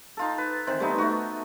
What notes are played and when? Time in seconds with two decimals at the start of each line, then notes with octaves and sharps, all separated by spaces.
0.17 D#4 F4 A4
0.38 B4
0.67 D#3 E3 C4 C5
0.80 G3 A3 B3 D#4
0.98 A3 F#4